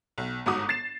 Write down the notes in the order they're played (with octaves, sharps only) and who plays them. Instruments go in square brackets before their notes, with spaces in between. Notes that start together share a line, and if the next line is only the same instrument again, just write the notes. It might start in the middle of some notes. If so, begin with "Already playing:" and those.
[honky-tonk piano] B1
G1 G#2 F#4 D6 D#6
A6 C7 E7